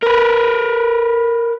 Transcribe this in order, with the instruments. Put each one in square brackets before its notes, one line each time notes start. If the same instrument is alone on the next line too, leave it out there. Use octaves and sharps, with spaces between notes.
[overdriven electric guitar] A#4 B4